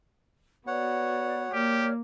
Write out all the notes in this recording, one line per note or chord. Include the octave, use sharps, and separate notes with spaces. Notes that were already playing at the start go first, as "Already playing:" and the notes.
B3 F#4 B4 C#5 D5 F#5
A#3 G4 C#5 D5 F6